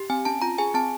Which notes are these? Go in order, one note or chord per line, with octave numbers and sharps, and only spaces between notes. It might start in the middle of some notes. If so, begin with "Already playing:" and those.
Already playing: G4
C4 G#5
C#4 A5
F4 A#5
G#4 G#5
C4 A5